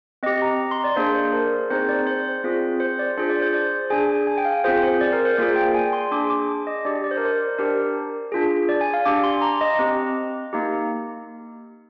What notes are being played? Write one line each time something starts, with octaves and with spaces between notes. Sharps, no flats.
C4 G4 D#5
A#5
C6
D5
A#3 D4 G#4 C5
C5
A#4
C4 D#4 G#4 C5
D5
C5
C4 F4 G#4
C5
D5
D4 F4 G#4 C5
D5
C5
D5
D4 G#4 G#5
G#5
G5
F5
C4 F4 G#4 C5
C5
D5
A#4
C5
A#3 F4 G#4 D5
G5
G#5
C6
D4 G#4 D6
D6
D#5
D4 G4 D5
D5
C5
A#4
C5
D4 G4 A#4
D4 F4 G#4
D5
G#5
F5
D4 G4 D6
C6
A#5
D#5
C4 G4
A#3 D#4 G4